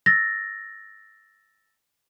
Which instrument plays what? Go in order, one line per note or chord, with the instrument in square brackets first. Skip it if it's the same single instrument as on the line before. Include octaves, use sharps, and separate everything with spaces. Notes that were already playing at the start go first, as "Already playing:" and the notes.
[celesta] E6 A6 A#6